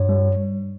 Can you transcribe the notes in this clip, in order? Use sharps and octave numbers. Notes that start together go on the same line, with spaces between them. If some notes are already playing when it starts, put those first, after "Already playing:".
Already playing: G2 C#5
G3